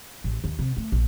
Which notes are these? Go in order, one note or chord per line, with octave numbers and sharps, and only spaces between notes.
A1
D#2
C3
A3
A#1